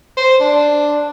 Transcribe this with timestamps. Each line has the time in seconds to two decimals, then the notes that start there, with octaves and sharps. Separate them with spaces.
0.17 C5
0.40 D4